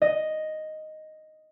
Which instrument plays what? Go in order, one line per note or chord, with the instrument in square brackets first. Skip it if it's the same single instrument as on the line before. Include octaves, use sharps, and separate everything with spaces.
[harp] D#5